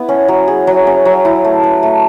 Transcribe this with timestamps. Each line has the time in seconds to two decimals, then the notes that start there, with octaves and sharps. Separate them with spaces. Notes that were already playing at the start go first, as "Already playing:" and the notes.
Already playing: B3 E4
0.09 C#4
0.28 F#3
0.48 G#4
0.67 F#3
0.87 C#4
1.05 F#3
1.25 E4
1.45 A3
1.63 B4
1.83 A3